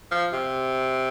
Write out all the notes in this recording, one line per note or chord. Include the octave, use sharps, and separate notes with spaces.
F3
C3